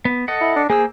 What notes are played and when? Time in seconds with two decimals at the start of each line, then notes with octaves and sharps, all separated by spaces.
0.05 B3
0.28 A4 D#5 F#5
0.41 E4
0.56 D4
0.70 A#3 G#4 C5 E6